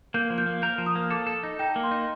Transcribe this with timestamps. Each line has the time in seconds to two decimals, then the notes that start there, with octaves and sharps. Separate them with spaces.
0.14 A#3 G6
0.30 F3
0.38 G6
0.46 A#3
0.62 A#4 G6
0.78 F3
0.86 D#6
0.95 A#3
1.10 A4 D6
1.27 A4
1.43 D#4
1.59 D#4 G5
1.76 A#3
1.83 C6
1.91 D#4